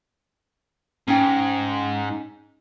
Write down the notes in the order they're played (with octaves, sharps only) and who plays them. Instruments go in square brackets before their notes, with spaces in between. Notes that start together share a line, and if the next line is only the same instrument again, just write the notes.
[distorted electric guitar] G#2 [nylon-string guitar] C#4 D#4 G5